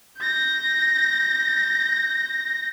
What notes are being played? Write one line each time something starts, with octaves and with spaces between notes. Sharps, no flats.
G6 A#6